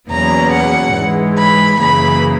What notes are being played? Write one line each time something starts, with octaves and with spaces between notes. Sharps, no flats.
E2 B2 F#3 A#3 C#4 A#5
F#5
G#2 E3 G#3
B5
F#2 C#3 E3 A#3 B5